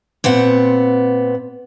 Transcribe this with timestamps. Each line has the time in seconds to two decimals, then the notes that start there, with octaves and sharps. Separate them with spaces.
0.24 A#2 B3 C4 F#5